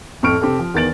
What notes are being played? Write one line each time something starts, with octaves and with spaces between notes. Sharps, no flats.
F2 A2 C4 C#6 F6 D7
F1 C4 G4 A4
F3
E2 D#3 B3 A6 D7 F#7